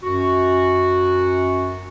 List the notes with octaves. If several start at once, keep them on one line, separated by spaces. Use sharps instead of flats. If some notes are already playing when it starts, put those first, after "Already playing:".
F#2 F#4